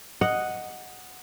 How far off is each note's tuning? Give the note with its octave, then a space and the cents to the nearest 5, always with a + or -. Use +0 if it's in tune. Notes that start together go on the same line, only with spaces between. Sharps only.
D#5 +0 F#5 +0